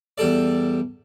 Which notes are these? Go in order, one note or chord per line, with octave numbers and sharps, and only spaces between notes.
E2 G3 A4 D5